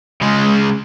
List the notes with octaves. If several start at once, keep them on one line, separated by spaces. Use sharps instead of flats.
C#3 G#3